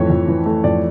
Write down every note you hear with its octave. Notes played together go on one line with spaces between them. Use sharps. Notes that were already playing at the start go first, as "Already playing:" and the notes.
Already playing: F2 E3 A3 C#5
F2
E3
A3
F2 D5